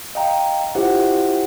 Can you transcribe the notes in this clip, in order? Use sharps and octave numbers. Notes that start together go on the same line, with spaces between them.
D#5 F5 G5 A#5
E4 F4 G4 C5 E5 F#5